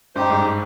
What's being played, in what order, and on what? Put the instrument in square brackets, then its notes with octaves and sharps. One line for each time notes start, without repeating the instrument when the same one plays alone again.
[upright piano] G2 [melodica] D#4 G4 C5
[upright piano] G#2